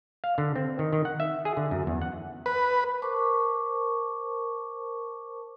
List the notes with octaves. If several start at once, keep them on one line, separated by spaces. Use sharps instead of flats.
F5
D3
C4
D#3
D#3
F#5
E5
G#4
D3
F#2
E2
F#5
B4
A#4 C5 A5 C#6 D6